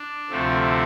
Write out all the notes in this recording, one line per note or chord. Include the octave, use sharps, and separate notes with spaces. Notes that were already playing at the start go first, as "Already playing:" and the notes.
Already playing: D4
D2 C3 F3 A3 C4